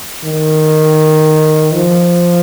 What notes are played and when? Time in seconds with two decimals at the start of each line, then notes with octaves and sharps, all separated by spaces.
0.24 D#3
1.73 F3